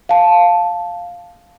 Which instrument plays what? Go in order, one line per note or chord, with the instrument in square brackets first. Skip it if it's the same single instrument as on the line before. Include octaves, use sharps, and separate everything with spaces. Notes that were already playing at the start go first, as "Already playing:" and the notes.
[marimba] F5 A5